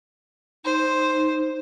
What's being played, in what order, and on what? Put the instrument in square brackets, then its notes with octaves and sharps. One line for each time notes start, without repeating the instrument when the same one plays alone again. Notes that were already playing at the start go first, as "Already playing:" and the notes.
[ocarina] D#4 [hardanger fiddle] C5